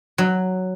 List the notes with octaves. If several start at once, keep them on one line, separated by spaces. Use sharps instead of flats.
F#3